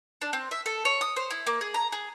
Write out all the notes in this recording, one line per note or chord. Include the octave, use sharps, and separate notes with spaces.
D4
C4
E5
A4
C#5
D#6
C5
E4
A#3
G#4
A#5
G#4